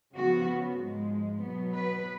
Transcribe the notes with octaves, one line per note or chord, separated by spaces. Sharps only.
C#3 F3 B3 F#4
G#2 F3 G#3
B2 F#3 B3
B4